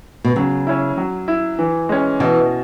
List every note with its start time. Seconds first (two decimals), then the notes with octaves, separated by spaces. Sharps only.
0.24 B2
0.36 C#3 F#3
0.67 C#4 E4
0.97 F#3
1.28 E4
1.59 E3
1.89 G#3 C#4
2.20 B2 E3